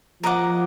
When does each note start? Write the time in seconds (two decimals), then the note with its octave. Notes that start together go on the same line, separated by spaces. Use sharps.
0.23 F3 A#4 D#5 F#5 D6